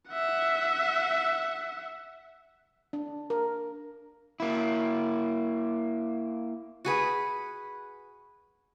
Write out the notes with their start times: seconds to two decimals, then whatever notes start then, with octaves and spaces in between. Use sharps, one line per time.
0.11 E5 F#5
2.93 D4
3.30 A#4
4.40 A#3 E4
6.85 F#4 G#4 B4